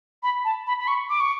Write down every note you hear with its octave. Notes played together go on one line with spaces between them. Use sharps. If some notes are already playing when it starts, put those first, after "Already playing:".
B5
A5
B5
B5
C#6
D6
C#6